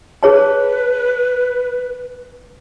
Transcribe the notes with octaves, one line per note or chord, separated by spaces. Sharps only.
G#4 B4 C#5 A5